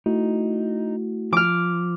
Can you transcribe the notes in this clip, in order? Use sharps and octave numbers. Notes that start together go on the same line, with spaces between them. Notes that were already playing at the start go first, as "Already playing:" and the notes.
A3 D#4 E4 F#4
F3 D6 F6